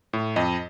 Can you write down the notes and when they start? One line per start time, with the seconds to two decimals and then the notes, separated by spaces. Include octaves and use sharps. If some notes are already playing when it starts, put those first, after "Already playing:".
0.13 A2
0.36 F2 D#5